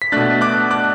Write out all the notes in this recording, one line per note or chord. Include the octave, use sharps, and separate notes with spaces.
B6
B2 A3 D4 F#6 A6
D6 F#6
D6 F#6